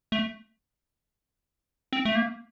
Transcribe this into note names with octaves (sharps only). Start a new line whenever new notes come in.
A3
C4
A3
A#3